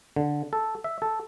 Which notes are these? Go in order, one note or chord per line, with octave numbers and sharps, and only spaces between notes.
D3
A4
E5
A4